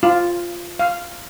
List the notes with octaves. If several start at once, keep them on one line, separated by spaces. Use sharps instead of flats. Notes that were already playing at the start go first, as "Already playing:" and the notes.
F4
F5